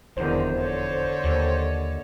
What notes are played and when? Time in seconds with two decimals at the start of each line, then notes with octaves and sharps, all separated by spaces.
0.17 F1 E2 D3 D#3 C5
0.58 D3 A4 C#5
1.24 D#2